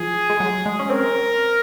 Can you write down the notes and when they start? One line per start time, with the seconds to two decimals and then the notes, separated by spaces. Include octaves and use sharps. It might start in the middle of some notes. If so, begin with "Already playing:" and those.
Already playing: F3 G#4
0.30 G#3
0.40 F#3
0.66 G#3
0.79 C#4
0.90 C4 A#4